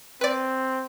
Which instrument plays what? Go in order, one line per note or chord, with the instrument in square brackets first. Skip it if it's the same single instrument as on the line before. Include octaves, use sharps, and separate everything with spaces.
[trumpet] C4 [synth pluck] B4 D5